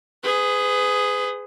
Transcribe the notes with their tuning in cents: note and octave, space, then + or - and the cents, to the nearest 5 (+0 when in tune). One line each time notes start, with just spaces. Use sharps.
G#4 +0 B4 +35